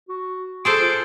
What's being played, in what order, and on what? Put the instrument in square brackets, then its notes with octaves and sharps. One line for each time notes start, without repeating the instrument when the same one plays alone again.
[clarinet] F#4
[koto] G#4 A4 C5 [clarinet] C6 [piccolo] D7
[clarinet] F4